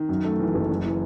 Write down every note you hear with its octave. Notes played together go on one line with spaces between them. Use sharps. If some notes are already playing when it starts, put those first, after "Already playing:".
Already playing: D#3
F#2
A3
E3
F#1
F#2
E3